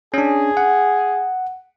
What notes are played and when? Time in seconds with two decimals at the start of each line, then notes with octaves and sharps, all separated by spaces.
0.14 C#4 D4 G#4
0.57 F#5